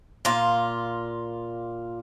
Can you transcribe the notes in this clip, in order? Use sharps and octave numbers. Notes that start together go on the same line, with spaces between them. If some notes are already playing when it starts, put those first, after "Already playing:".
A#2 F4